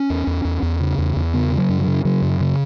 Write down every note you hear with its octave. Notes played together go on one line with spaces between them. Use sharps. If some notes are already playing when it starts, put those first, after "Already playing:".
Already playing: C#4
E2
E2
E2
E2
C#3
E2
E2
C#3 B3
C#3
F#3
F#2
F#3
C#3
C#3 F#3
F#2
C#3